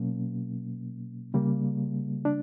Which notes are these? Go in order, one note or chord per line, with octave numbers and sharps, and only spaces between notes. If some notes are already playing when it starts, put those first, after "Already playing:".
Already playing: B2 F#3 A#3 C#4
C#3 G3 A#3
D4